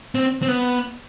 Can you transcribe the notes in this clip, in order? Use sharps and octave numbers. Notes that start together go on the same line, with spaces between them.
C4
C4
B3